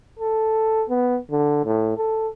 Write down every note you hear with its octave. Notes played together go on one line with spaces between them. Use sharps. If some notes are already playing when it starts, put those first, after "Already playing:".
A4
B3
D3
A2
A4